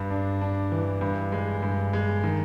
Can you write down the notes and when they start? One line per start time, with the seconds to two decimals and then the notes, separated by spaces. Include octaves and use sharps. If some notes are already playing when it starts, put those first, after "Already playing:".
Already playing: G2
0.10 D4
0.41 D4
0.72 E3
1.01 G2
1.32 G#3
1.63 G2
1.93 G#3
2.24 D#3